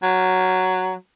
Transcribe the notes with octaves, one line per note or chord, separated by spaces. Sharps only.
F#3